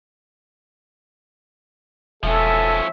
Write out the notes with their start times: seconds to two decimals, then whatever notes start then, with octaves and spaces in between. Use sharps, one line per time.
2.23 E1 F3 C#4 A4 E5